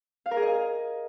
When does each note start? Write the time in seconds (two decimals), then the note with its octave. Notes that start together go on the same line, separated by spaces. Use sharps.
0.26 F5
0.31 A#4
0.37 G#4
0.42 D#5
0.48 G#5